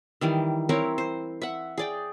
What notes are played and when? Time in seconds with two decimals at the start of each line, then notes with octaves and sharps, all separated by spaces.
0.21 D#3 E3 G3
0.69 C4 E4 A#4 C#5
0.98 C5
1.42 E5 F#5
1.78 G#4 D5 G5